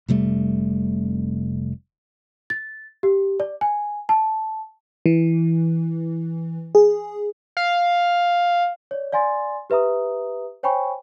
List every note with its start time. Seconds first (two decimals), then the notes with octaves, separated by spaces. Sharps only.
0.08 F1 C3 G3 A3
2.50 A6
3.03 G4
3.40 D5
3.61 G#5
4.09 A5
5.06 E3
6.75 G#4
7.57 F5
8.91 C#5 D5
9.12 D5 F5 G#5 C6 A6
9.70 G4 B4 E5 A#5 D#6
10.63 C5 C#5 G5 G#5 B5 C#6